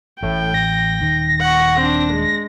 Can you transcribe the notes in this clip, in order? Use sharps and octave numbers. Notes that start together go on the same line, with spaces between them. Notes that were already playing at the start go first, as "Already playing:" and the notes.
A1 A2 E3 G5
A#6
D#1 D#3
F#5 C#6
C4 D4
G#3